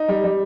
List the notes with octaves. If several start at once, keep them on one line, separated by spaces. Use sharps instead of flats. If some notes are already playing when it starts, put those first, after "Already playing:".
Already playing: D#4
G3
G3